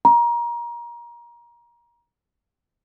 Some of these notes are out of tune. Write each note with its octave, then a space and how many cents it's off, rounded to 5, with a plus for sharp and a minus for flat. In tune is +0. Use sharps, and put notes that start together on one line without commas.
A#5 +25